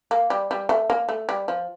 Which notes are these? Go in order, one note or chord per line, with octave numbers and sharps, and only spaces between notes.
A#3
G3
G3
A3
A#3
A3
G3
F3